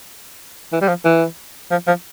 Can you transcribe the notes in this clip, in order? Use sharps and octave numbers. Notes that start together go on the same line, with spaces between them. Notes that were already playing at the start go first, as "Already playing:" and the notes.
E3
G3
F3
E3
F3
F3